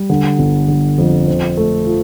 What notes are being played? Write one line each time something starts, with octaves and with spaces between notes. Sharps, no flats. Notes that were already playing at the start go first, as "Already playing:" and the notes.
Already playing: G3
D3
G1
D3
F2
C4
A3
F3